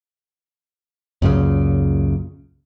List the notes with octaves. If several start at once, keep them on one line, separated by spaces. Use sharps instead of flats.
C#2 F#2 A#2 C#3